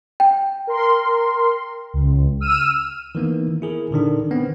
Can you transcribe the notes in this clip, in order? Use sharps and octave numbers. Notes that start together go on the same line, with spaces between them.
G5
A#4 C6
C#2
E6 F6 D#7
D#3 E3 A#3 B3
E4 G#4 A#4
A#2 D3 D#3 D4
D#3 B3 C4